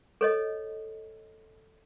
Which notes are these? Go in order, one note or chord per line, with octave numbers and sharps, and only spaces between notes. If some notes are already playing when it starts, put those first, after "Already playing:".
A4 C#5 D#5